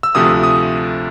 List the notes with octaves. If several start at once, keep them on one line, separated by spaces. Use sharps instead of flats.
E6
D2 C3 F3 A3 D#6
D#6